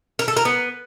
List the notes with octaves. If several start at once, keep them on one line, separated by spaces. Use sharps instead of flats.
A#4
A4
A#4
B3